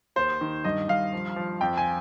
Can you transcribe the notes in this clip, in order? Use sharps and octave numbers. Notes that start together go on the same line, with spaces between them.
D#2 C5
D#3
G2 D#5
G2 F5
F3
F3
F2 G5
G#5